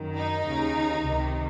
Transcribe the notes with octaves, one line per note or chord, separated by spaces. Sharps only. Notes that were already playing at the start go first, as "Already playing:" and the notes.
Already playing: F#2 D#3
D#4
D#2 C#3
C#2 C3 D#3